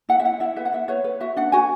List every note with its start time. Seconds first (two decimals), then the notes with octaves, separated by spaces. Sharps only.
0.09 E4 F#5
0.20 E5
0.25 E4 F#5
0.40 E4 E5
0.56 B4 E5
0.65 F#5
0.72 E4 E5
0.88 B4 C#5
1.04 B4
1.20 F#4 E5
1.37 D4 F#5
1.52 F#4 G#5